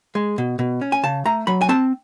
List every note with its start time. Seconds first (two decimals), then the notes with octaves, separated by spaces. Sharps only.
0.15 G#3
0.38 B2
0.59 B2
0.81 C#4
0.92 G#5
1.03 C#3 A5
1.26 A3 A#5
1.47 F#3 B5
1.61 G#5
1.69 C4 A5